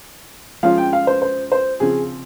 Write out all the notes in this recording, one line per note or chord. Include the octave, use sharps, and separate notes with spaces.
F3 G#3 C#4 F4 F5
G5
F5
C5
C5
C5
C#3 F3 C4 G#4